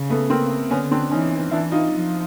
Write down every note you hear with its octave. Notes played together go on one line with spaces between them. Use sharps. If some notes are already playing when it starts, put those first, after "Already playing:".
Already playing: C#3
A3 B3
A#3 C4
D3 B3 C#4
C4 D4
E3 C#4 D#4
E3 D4 E4
D#4 F4
F3